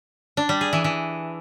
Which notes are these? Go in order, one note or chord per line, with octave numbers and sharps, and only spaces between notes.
D4
G3
G#4
E3
E3